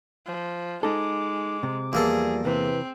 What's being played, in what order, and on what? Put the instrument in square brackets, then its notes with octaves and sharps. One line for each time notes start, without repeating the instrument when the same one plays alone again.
[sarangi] F3
[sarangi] G#3 [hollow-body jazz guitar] D#4 A4 [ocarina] D6
[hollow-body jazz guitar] C3
[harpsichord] E2 A#3 A4 [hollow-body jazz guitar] F3 G3 [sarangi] G#4
[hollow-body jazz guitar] C3 E3 [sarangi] C4 [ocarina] B4